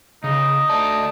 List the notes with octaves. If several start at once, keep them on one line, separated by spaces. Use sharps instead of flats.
C#3 D#4 D#5
A3 D5 A5